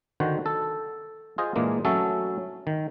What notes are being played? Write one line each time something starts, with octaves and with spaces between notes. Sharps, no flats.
D3 D#3 F#4 C5
A4
F4 G#4 C5 D#5
A#2 E3 G#3 A#3 D4
F#3 A3 C#4 A4 E5
D#3